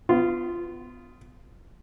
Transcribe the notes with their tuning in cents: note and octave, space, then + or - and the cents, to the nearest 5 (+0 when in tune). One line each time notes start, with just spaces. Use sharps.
B3 +25 F4 -15